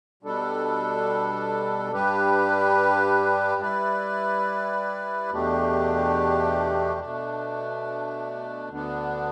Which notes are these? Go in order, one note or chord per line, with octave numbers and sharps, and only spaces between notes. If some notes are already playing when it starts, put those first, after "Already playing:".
B2 G3 D4 A4
G2 G3 D4 G4 B4
G3 E4 B4 D5
E2 B2 A3 D4 G4
B2 A3 D4
D2 D3 B3 D4